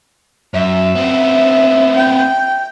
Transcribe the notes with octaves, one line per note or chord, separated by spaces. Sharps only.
F#2 E5
B3 C4
G5